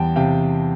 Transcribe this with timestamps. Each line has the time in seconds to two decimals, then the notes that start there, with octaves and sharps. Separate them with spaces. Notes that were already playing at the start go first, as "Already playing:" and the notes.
Already playing: E2 G3 G5 A5
0.16 C3 F5 G5